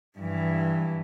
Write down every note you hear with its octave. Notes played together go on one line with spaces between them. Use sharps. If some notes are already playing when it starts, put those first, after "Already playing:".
G2 E3